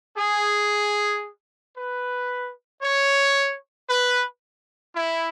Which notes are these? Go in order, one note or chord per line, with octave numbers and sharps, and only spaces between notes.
G#4
B4
C#5
B4
E4